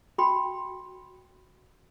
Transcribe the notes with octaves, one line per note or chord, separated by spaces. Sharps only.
F#4 A4 G5 B5 C6